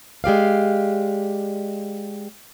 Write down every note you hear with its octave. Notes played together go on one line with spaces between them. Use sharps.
G#3 G4 D5 F5